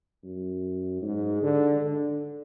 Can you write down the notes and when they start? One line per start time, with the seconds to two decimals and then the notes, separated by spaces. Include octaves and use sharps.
0.23 F#2
1.02 G#2
1.42 D3
1.80 D3